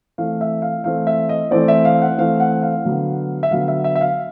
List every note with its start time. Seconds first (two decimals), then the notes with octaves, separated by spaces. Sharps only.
0.18 E3 A3 C4 F5
0.41 E5
0.62 F5
0.84 E3 A3 C4 F5
1.07 E5
1.29 D#5
1.51 E3 A3 C4 D5
1.68 E5
1.85 F5
2.02 F#5
2.18 E3 A3 C4 F5
2.40 F#5
2.63 F5
2.85 D3 F#3 B3
3.43 E5
3.51 D3 F#3 B3 F5
3.68 E5
3.84 E5
3.96 E5
4.01 F5